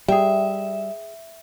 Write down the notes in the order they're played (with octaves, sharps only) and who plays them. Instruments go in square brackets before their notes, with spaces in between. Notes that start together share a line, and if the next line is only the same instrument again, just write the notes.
[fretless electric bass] G3 [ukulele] G#4 G5 [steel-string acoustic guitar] E5